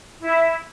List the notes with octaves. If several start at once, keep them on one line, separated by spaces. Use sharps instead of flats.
E4